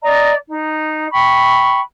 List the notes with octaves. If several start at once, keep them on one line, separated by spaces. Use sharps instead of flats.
D5 D#5 A#5
D#4
G5 B5 C#6